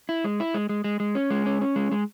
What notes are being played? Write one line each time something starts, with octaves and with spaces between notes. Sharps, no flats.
E4
G#3
E4
G#3
G#3
G#3
G#3
C#4
G#3
C#4
C#4
G#3
G#3